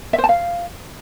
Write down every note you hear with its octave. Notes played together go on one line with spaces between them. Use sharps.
E5
C5
A5
F5